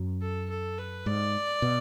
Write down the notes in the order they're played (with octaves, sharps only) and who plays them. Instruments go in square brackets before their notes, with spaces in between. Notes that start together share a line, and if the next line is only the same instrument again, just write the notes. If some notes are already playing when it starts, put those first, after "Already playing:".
Already playing: [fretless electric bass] F#2
[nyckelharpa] A4
A4
B4
[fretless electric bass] G#2 [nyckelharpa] D5
[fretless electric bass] B2